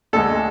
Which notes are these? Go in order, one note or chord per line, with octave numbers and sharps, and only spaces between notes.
D2 D3 G#3 A4